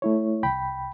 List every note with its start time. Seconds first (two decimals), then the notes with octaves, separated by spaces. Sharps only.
0.02 A3 E4 C#5
0.43 C2 G5 B5